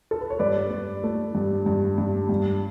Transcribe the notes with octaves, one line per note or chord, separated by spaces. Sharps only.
A4
B4
C#5
G2 B4 D5
G2
A3
G2
G2
G2
G2